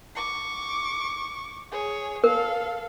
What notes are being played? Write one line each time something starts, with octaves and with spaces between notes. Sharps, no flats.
C#6 D6
G#4 C#5
A4 A#4 F5